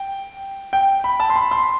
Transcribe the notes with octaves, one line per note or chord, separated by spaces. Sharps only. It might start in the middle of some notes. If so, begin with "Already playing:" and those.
Already playing: G5
G5
B5
A5
C6
B5
C6